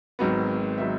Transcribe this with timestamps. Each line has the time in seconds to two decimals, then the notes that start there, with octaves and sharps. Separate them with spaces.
0.19 G#1 G#2 D#3 F#3 B3
0.78 D#3 F#3 B3 E5